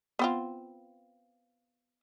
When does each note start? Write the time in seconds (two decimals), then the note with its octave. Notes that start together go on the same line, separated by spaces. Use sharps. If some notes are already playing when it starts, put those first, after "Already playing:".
0.19 B3 C4 F4